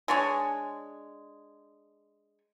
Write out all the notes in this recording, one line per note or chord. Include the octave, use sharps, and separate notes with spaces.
G#3 D4 C#5 G#5